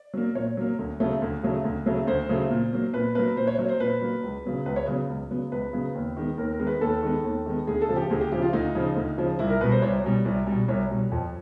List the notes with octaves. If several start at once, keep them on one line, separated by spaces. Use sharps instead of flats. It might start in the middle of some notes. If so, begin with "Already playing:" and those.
Already playing: D5
F#3 A#3
A#2 C#5
F#3 A#3
D2
C#3 F#3 A3
D2
C#3 F#3 A3
D2
C#3 F#3 A3
D2 C5
C#3 F#3 A3
A#2
F#3 A#3
A#2 B4
F#3 A#3 B4
A#2 C5
C#5
F#3 A#3 C#5
C5
A#2 B4
F#3 A#3
C#2
C#3 F#3 B3
C#2 B4
C#5
C#3 F#3 B3
C#2
C#3 F#3 B3
C#2 B4
C#3 F#3 B3
D#2
D#3 G#3 B3
D#2 A#4
A#4
D#3 G#3 B3
B4
D#2 A4
D#3 G#3 B3
D#2
D#3 G#3 B3
D2 G#4
A4
C#3 F3
G4
D2 G#4
G4
C#3 F3 G4
F4
D2 D#4
C#3 F3
D2
C#3 F3
C2 E4
A#4
B2 G3 B4
C5
C2 C#5
B2 G3
C2
B2 G3
C2 C#5
B2 G3
F2